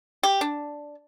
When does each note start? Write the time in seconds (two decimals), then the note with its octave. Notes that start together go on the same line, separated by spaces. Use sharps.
0.23 G4
0.41 D4